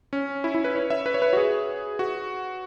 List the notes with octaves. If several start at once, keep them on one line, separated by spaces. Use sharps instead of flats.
C#4
E4
E4
B4
C#5
E5
B4
C#5
B4
F#4
G#4
F#4